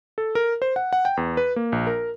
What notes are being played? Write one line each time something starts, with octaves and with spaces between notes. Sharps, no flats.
A4
A#4
C5
F#5
F#5
G5
E2
B4
A#3
A#1
A#4